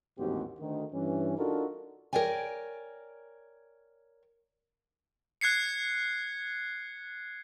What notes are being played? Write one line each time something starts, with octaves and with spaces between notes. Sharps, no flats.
A1 D#2 G#2 C4 F#4 G4
D2 D#3
G2 E3 C#4
D4 D#4 F4 F#4 A4 A#4
A#4 C#5 D5 G5 G#5
F#6 G#6 C7 C#7